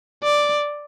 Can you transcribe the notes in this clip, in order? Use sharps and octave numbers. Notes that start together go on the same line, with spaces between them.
D5